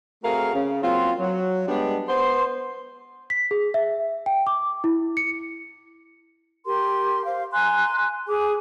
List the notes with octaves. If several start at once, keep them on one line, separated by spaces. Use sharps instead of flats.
A3 C4 F#4 G#4 A#4 F5
C#3
F#3 A#3 C4 F4
F#3
G3 G#3 B3 D4
B3 C5 C6
B6
G#4
E5
G5
D6
E4
C#7
G4 A#4 C6
C5 F5
G#5 A#5 C6 F#6
G#4 D6